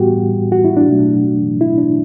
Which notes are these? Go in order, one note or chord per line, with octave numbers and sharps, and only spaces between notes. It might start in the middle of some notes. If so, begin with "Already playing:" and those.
Already playing: A2 G3 B3 F#4 G4
F#4
E4
D4
B2 F#3 A3
E4
D4